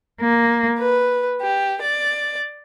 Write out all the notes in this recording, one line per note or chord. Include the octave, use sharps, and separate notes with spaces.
A#3
B4
G4
D5